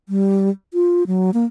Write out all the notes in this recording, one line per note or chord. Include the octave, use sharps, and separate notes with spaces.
G3
F4
F#3
A#3